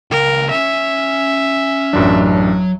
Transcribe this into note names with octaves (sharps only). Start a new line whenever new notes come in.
C#2 A#4 G5
C#4 E5
A1 F#2 F#3 D4